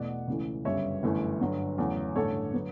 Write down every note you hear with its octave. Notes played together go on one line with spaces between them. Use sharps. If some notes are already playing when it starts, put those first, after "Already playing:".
Already playing: E2 B2 A3 D5 F#5
C#2 C#3 E3 A3
G1 F#2 C#3 G3 B3 C#5 E5
G1 F#2 E3 A3
G1 G2 D3 F#3
E2 C#3 F#3 A3
A1 G2 D3 A3 A4 C#5
D3 F#3 B3